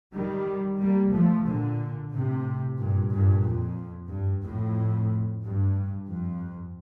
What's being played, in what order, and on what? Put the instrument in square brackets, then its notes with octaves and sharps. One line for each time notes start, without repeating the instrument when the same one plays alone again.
[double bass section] D#3 G3
G3 A#3
F3 A3
A#2 D3
A2 C3
G2 A#2
G2 A#2
F2
G2
F2 A2
G2
F2